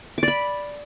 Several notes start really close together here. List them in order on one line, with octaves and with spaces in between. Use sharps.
D6 D5 B5